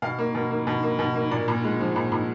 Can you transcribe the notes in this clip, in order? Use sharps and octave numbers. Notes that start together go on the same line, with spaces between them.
B2 F5
A#3
B2
A#3
B2
A#3
B2
A#3
A#2 D5
A#2
G#3
F3
A#2
A#2